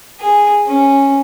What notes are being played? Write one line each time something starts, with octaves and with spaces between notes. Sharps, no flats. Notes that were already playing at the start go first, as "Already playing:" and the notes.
G#4
C#4